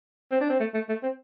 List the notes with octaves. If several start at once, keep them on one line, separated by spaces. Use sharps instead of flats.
C4
D4
C4
A3
A3
A3
C4